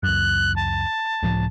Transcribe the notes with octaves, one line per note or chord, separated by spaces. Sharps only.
C#2 F#2 F#6
A5
C#2 A2 F3